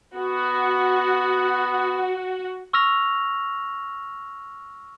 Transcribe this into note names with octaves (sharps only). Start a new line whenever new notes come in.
B3 F#4
C#6 E6 F6 A#6 F7